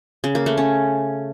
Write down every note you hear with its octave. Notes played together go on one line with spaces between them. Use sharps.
C#3
A#3
A3
C#4